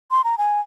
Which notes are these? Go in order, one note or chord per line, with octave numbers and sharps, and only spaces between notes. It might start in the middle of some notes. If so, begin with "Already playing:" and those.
C6
A#5
G#5